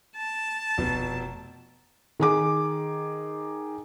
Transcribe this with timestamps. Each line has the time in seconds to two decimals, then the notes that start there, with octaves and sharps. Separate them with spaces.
0.16 A5
0.78 F1 B2
2.20 D#3 G#4 D6